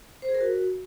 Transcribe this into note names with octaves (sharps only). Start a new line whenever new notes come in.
C5
G#4
A#4
F#4